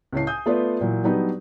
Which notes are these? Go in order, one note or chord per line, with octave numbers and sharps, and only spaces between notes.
C#2 A2 C#5 A5 C7
G#5 D#6 G6
A3 B3 F4 B4 D5
A#2 E3 F#3
F#3 G3 B3 D4 D#4 B4